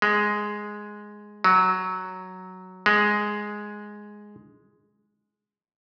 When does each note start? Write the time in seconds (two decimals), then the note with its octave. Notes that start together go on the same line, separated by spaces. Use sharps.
0.02 G#3
1.44 F#3
2.86 G#3